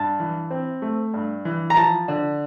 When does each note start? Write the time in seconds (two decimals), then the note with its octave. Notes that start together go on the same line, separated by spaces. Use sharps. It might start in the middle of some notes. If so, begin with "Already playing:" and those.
Already playing: G2 A5
0.20 E3
0.50 C4
0.82 A3
1.14 G2
1.45 E3
1.70 A#5
1.77 F3 A5
2.08 D3